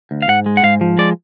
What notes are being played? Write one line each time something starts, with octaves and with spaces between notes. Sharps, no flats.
D2
F5
G#2 F#5
G#3
F#5
G#2 F5
F3
G#3 D5